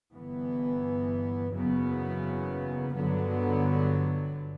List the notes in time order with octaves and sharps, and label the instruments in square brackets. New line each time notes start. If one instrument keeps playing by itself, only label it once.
[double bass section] G1 G2 E3 B3
F#1 E2 C#3 F#3 B3
G1 G2 D3 F#3 B3